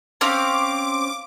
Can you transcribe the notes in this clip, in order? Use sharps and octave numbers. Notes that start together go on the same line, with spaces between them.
C4 C#4 F5 D6